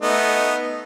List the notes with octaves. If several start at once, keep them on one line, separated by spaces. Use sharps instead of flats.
A3 B3 D#4